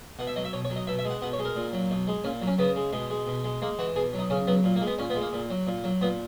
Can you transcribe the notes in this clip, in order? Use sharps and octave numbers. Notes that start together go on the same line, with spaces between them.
B2 F#5
E5
F#3 D#5
E5
B2 C#5
C#5
F#3
D#5
B2 E5
E5
G#3
F#5
B2 F#5
C#5
G#3
A#4
A#2
F#3
B2
G#3
A#2 C#4
F#3
C#4
C#3 B3
G#3
B2 G#3
G#3
B2
G#3
G#3 A#3
E3 F#4
B2 G#4
F#3
D#4
C#3 C#4
F#3 B3
A#2
A#3
G#3
B3
A#2 C#4
B3
G#3
A#3
A#2
F#3
A#2
F#3
A#2 B3